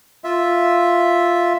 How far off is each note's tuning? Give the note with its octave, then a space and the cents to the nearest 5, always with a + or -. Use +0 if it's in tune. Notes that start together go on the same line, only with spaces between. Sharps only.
F4 +0 E5 +0